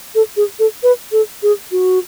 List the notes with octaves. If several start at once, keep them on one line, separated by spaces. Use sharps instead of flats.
A4
G#4
A4
B4
A4
G#4
F#4